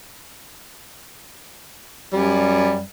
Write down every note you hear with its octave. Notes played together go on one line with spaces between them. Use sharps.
F#2 G3